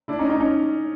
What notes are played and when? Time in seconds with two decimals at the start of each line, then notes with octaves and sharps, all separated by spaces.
0.08 D4 E4
0.19 C#4 D#4
0.30 C#4 D#4
0.40 C#4 D#4